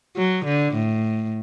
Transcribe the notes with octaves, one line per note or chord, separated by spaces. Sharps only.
F#3
D3
A2